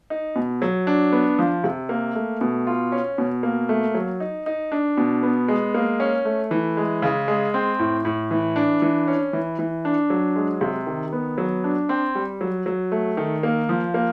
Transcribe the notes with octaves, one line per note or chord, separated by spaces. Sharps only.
D#4
B2
F#3
D4
B3
F3
C3
A#3
A3
B2
F4
C#4
B2
A#3
A3
F#3
D#4
D#4
D4
B2
B3
G#3
A#3
C#4
A3
E3
G#3
C#3
G#3
C4
A2
A2
E3
D4
E3
C#4
E3
E3
D4
F#3
G#3
C3
D#3
B3
F#3
D4
C4
G3
F#3
F#3
A3
D#3
A#3
F3
A#3